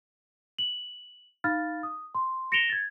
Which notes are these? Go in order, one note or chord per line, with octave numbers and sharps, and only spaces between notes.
F#7
D#4 F5 B5 F6 A6
D#6
C6
A#6 C#7 D7 E7 F7 G7
G#6 A6